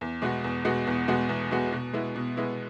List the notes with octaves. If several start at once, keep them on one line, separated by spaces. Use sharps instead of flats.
E2
B2 G#3 B3 F#4
E2
B2 G#3 B3 F#4
E2
B2 G#3 B3 F#4
E2
B2 G#3 B3 F#4
B2
G#3 B3 E4
B2
G#3 B3 E4